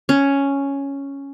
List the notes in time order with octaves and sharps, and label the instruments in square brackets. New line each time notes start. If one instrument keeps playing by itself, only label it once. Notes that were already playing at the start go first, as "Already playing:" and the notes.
[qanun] C#4